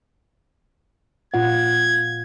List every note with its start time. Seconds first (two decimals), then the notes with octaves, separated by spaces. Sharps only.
1.34 A#2 F4 F#5 G#6